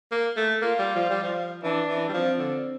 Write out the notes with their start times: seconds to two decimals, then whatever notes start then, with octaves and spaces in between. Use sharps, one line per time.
0.12 A#3
0.37 A3
0.62 A#3 F4
0.79 G3
0.96 F3
1.10 G3
1.23 F3
1.63 E3 D4
1.88 E3
2.09 G3
2.13 F3 C4
2.39 D3